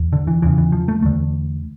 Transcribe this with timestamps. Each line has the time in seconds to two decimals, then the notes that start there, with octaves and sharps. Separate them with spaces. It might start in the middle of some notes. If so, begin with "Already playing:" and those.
Already playing: E2
0.13 D3
0.27 E3
0.42 E2 C#3 E3
0.58 E3
0.72 F3
0.88 A3
1.02 E2 D3 A3